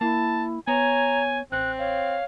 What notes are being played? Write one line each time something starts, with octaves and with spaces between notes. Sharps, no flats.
A#3 E4 A5
B3 C#5 G#5 A#5
A1 C4 F#6
C#5 F5